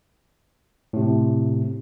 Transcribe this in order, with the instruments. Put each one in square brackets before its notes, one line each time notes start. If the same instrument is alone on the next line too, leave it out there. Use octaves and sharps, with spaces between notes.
[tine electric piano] A2 C3